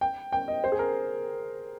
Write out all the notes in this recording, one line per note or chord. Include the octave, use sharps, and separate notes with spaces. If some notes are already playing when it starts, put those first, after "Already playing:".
G5
G5
D#5
C5
G#4
A#4